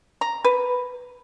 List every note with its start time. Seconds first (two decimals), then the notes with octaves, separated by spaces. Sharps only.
0.21 A#5
0.44 B4